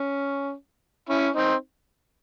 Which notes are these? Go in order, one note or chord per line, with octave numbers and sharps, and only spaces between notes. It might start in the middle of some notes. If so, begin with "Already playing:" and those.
Already playing: C#4
C#4 E4
C4 D#4